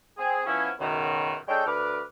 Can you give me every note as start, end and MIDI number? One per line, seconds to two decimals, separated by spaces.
0.18 0.42 60
0.18 0.42 68
0.46 0.69 53
0.46 0.69 59
0.46 0.69 61
0.46 0.69 64
0.79 1.36 37
0.79 1.36 42
0.79 1.36 47
0.79 1.36 51
1.48 1.64 56
1.48 1.64 62
1.48 1.64 69
1.48 1.64 73
1.48 1.64 79
1.66 2.01 38
1.66 2.01 71
1.66 2.01 86
1.66 2.01 89